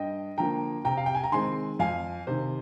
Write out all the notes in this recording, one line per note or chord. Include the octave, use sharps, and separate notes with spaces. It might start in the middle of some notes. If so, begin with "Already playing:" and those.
Already playing: G2 D#5 G5
D3 F3 A#3 G5 A#5
C3 G5 A#5
F5
G5
G#5
A#5
D#3 G#3 C4 G#5 C6
F2 F5 G#5
C3 D#3 C5